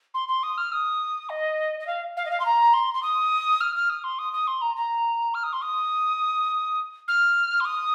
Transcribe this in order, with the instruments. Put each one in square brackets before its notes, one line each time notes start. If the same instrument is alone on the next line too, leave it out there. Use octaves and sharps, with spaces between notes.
[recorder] C6
C6
D#6
F6
D#6
D#5
D#5
F5
F5
D#5
F5
C6
A#5
C6
C6
D#6
F6
F6
D#6
C6
D#6
D#6
C6
A#5
A#5
F6
D#6
C6
D#6
F6
C6
D#6